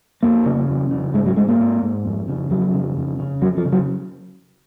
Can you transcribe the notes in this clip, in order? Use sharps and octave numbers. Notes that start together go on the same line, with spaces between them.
F2 A#3
C#3
F2
C#3
G#2 G#3
F#3
G#2 G#3
A#3
G#2
G#2
F2
C#3
F2 F#3
C#3
F2
C#3
F2 F#3
F3
C#3
F#3